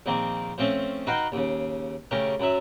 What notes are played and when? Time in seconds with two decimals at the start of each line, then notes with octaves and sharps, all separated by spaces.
0.06 A#1 D#3 A#3 C4
0.58 F3 A3 C4 C#4
1.07 D#4 F#4 B4 F5 G5
1.32 D#2 C#3
2.11 C#3 A3 C#4 G4 A#4
2.40 F#2 F#3 E5